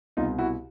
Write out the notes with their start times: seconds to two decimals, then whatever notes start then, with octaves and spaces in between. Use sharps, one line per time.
0.17 C2 B2 D#4 F4
0.39 E4 F#4